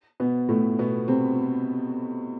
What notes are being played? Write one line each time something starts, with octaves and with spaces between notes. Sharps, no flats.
B2 B3
A2 A3
B2 B3
C3 C4